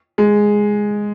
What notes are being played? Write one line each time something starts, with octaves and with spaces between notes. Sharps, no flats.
G#3